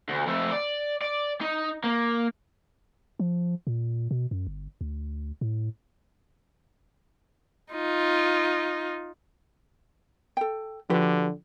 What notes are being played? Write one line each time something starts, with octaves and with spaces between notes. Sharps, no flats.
D2
F2 A3
D5
D5
D#4
A#3
F3
A#2
B2
F#2
G1
D2
A2
D#4 F4
A4 G5
D3 F3 F#4 G4 B4